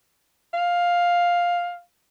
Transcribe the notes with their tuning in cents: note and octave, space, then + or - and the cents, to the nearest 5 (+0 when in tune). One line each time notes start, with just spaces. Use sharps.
F5 +5